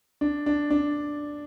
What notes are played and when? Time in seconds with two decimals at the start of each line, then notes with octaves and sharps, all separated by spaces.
0.21 D4
0.46 D4
0.70 D4